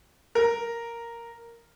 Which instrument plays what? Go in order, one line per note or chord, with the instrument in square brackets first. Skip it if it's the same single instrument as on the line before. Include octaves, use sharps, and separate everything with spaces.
[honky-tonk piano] A#4